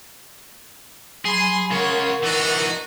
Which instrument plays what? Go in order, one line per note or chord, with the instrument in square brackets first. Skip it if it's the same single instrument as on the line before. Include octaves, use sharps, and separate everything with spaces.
[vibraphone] F#3 G#5 B5 [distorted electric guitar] G#4 [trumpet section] C6
[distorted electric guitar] C#3 F4 [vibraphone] A#4 F#5 C#6 [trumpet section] C#5
[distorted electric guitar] E3 D#4 [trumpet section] D4 F#4